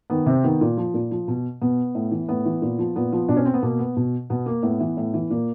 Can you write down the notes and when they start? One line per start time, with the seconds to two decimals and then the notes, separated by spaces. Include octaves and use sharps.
0.10 D#3 B3
0.26 C3 C4
0.44 D#3 B3
0.61 A#2
0.77 F3
0.94 A#2
1.11 F3
1.28 B2
1.61 B2 B3
1.95 A2
2.11 E3
2.29 A2 B3
2.45 E3
2.62 A#2
2.79 F3
2.96 A#2 B3
3.12 F3
3.29 B2 D4
3.37 C#4
3.45 C4
3.54 B3
3.62 B2 A#3
3.79 B3
3.97 B2
4.30 B2 B3
4.46 A#3
4.63 A2 B3
4.80 E3
4.97 A2
5.14 E3
5.30 A#2 A#3